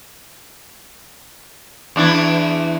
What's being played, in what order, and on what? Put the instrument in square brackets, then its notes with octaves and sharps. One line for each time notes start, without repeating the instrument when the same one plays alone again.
[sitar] E2 D4 E4